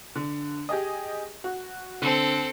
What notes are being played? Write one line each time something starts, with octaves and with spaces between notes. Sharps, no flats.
D3
G4 G#4 D#5
F#4
D3 C4 A4